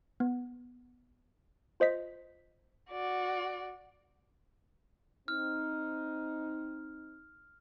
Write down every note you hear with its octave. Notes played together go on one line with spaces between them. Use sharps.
B3
F4 C5 D#5 B6
F#4 D5
C4 D#4 F6